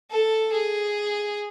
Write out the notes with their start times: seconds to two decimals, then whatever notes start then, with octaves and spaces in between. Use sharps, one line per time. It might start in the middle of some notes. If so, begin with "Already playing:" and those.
0.11 A4
0.52 G#4